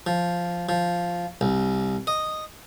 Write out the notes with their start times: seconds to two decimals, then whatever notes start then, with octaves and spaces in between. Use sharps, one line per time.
0.06 F3
0.69 F3
1.41 C2
2.07 D#5